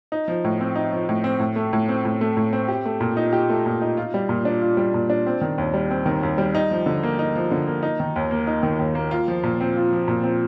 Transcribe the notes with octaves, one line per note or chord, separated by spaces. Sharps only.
D#4
F3
A2
C4
D#4
F3
A2
C4
A2
A3
A2
C4
A2
A3
A2
C4
G4
A3
A#2
D#4
G4
A3
A#2
D#4
F4
G3
A#2
D4
F4
G3
A#2
D4
C4
D#3
D#2
G3
C4
D#3
D#2
G3
D#4
F3
D3
A#3
D#4
F3
D3
A#3
D#4
D#3
D#2
A#3
D#4
D#3
D#2
A#3
F4
F3
A#2
C4
F4
F3
A#2
C4